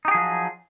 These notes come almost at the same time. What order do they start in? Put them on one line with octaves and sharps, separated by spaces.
D#4 G4 G#4 F3 F#3